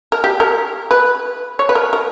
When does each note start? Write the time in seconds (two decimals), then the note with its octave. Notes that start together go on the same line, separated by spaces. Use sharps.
0.12 A#4
0.24 G4
0.40 A#4
0.91 B4
1.59 C#5
1.69 B4
1.75 A#4
1.93 A#4